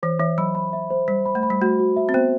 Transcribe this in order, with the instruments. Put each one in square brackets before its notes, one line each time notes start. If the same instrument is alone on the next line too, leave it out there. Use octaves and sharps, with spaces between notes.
[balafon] E3 [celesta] C5
[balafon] E3 [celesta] E5
[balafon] F#3 [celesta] B5
[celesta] B5
E5
C5
[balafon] G3 [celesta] C5
[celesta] B5
[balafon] A3
[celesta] B5
[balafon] G3
[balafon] A3 [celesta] F#4
[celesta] F#4
E5
[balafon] C4
[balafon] B3 [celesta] C5